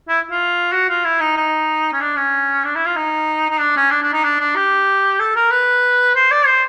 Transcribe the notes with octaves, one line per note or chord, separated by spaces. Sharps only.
E4
F4
F#4
F4
E4
D#4
D#4
C#4
D4
C#4
D4
E4
F4
D#4
D#4
D4
C#4
D4
D4
D#4
D4
D4
G4
A4
A#4
B4
C5
D5
C5